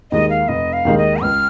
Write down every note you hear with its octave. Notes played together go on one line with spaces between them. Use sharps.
D#2 D#3 G#3 D#4 D#5
F5
F1 D#5
F5
D#2 D#3 G#3 D#4
D#5
C#2 F6